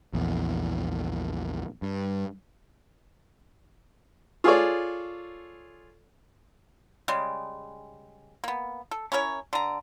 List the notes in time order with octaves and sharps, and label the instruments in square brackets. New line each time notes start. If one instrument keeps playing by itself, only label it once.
[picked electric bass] A#1 E2
G2
[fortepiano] F4 G#4 A4 C#5 D5
[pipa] C#3 G3 G#3
A#3 B3
A4
C#4 E4 A#4 C#5
D3 A#5